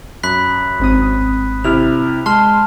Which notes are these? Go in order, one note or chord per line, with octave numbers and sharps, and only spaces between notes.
F#2 B5 F#6 B6
G#1 C4 D#6
C3 E4 F6 F7
G#3 A5 C6 F6